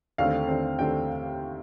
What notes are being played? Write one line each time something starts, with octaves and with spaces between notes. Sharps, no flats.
D#2 D3 A3 C4 F5
D#2 D3 A3 C4
D#2 D3 A3 C4 G5